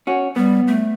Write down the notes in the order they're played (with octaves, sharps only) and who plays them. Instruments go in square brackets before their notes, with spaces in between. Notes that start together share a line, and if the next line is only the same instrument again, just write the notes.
[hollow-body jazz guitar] C#4 F#4
[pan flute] G3 [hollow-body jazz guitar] B3
[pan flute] A3